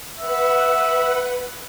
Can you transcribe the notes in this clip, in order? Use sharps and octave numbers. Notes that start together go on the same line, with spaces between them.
B4 E5 F#5